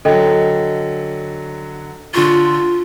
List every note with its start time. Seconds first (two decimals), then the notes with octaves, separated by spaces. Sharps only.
0.05 D3 F#3 A4 D#5 G5
2.14 D3 F4 C#6